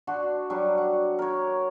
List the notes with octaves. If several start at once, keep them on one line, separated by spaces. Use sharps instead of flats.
D4 F#4 F#5 C6
F#3 G3 D4 F#4
F#5
A#4 C#5